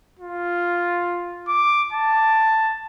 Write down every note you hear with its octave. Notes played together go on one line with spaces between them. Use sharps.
F4
D6
A5